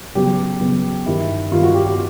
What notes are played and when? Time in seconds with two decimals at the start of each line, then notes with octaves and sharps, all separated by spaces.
0.15 C#3 F#3 B3 G4
0.61 C#3 F#3 B3
1.06 G2 D#3 G3 E4
1.52 G2 D#3 G3 F4
1.63 F#4
1.74 G4
1.86 G4